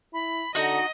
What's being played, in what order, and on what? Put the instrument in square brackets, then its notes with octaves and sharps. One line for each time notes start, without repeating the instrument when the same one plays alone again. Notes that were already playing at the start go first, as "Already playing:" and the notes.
[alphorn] E4 [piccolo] B5
[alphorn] D3 [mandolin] D#4 F#4 [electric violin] D#5 [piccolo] A#5